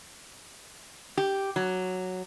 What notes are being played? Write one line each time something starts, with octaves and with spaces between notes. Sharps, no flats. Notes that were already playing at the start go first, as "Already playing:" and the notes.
G4
F#3